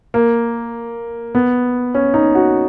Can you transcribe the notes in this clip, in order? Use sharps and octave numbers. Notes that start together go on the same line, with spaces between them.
A#3
B3
C#4
D#4
F#4